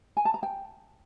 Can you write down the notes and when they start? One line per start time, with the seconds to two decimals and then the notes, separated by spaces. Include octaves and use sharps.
0.17 G#5
0.25 A5
0.34 A#5
0.43 G5